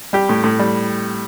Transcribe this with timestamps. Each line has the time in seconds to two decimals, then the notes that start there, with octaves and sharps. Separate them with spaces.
0.13 G3 G4
0.29 A2
0.44 A2
0.59 G3